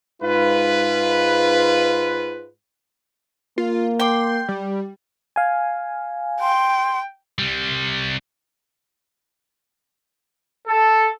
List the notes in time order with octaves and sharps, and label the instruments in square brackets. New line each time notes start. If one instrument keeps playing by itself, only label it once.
[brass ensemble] G#2 F4 B4
[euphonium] A#3 [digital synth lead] F4
[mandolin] G5 D6 [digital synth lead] C6
[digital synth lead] G3
[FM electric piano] F5 G#5
[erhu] G5 [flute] C6
[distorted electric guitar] C3 G3
[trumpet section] A4